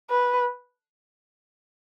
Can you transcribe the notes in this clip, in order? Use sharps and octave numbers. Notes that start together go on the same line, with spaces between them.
B4